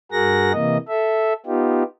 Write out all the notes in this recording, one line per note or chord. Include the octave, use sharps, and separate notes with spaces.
G2 F#4 G#4 A#4 F#5 A#6
C3 E3 A#3 D#5
A4 E5
B3 D#4 F4 G4